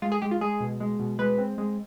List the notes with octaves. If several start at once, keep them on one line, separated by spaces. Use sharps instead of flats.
G#3 F4
G#4
G#3 G4
F4
G#3 G#4
B2
G#3
B2
G#3 B4
C4
G#3